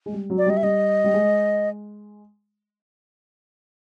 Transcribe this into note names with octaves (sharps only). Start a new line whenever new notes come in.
G#3
G3
F#3
D5
G3 D#5
E5
G3 D#5
G3
G#3